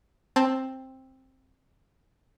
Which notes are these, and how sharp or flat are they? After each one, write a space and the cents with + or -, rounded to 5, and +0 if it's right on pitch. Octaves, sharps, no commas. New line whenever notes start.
C4 +10 A5 +0